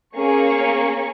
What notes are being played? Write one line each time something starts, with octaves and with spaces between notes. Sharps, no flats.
A#3 C#4 G#4 C#6